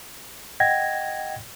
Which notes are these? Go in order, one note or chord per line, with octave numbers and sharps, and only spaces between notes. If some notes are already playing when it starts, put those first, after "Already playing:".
D#5 F#5 G5 G#6 A#6